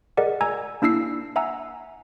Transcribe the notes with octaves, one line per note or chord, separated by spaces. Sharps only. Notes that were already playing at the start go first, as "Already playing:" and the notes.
G#4 A#4 D5 D#5 F#5
G#5 A#5 E6 G#6
A#3 D4 E4 E6 C7
E5 F#5 G#5 A#5 E6